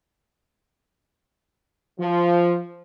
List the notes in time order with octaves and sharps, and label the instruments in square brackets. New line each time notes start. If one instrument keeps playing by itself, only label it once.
[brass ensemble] F3